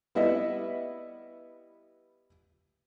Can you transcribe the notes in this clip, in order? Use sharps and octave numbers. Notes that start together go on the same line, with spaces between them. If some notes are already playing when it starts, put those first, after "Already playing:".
G3 B3 E4 D#5 E5